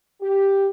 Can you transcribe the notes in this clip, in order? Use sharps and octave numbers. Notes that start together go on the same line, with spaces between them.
G4